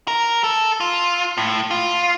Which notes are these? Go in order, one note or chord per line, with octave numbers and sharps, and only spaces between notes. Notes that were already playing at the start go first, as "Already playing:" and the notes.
A#4
A4
F4
A2
F4